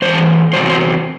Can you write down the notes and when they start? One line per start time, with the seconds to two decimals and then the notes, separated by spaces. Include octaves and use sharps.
0.02 G#2 E3 G#3 C5
0.53 E2 C3 F#3 C4 C5
0.70 C5